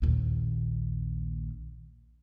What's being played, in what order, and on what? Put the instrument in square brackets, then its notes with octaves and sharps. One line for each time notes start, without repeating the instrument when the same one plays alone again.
[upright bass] A#1 D#2